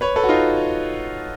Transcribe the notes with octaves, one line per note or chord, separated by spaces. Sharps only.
B4 C#5
A4 B4
F#4
D#4 F4